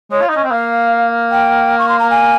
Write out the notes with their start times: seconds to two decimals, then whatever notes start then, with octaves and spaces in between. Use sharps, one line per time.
0.11 G#3 C#5
0.21 F4
0.29 D#4
0.32 C#4 D#5
0.44 C4
0.51 A#3 F5
1.31 G5
1.79 C#6
1.89 C6
1.99 A#5
2.11 G#5